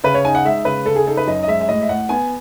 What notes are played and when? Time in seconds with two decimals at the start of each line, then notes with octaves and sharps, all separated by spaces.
0.04 C#3 B4
0.14 C#5
0.25 D#4 G#5
0.35 F#5
0.45 G#3 E5
0.65 C#3 B4
0.86 C#3 A4
0.96 G#4
1.07 D#4 A4
1.17 B4
1.27 F#2 D#5
1.43 D#5
1.48 G#3 E5
1.61 E5
1.68 A2 D#5
1.82 E5
1.89 A2 F#5
2.09 B3 G#5